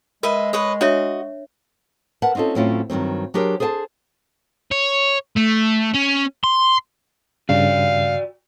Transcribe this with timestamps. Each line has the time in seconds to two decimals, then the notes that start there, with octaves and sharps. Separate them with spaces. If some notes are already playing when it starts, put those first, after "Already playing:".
0.23 G#3 A#4 B4 D#5 E5
0.53 B4 C#5 D#5
0.81 D4 F#4 C#5 D#5 E5
2.22 A#4 B4 F#5 A5
2.35 C4 C#4 D#4 F4 A4
2.55 A2 F#3 C4 C#4 E4 F4
2.90 G2 D#3 F#3 C4
3.34 F#3 D4 G4 G#4 A#4 C5
3.60 G#4 A4 C5 G#5 A5
4.71 C#5
5.36 A3
5.94 C#4
6.44 C6
7.49 G2 C#3 F#4 D5 F5